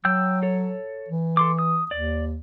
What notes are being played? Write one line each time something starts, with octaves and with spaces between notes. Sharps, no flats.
F#3 G5 E6 G6
A4 C#5
E3
A4 C6 D6
D#6
D#2 D5